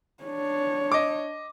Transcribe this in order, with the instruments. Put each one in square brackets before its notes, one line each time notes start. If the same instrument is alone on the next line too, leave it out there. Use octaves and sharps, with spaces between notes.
[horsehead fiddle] D4 C#5
[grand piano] D#5 D6